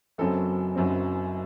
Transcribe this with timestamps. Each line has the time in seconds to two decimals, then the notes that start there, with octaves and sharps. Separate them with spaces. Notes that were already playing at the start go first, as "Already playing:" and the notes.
0.18 F#1 F#2 F#3 C4 A4
0.75 F#1 F#2 F#3 C4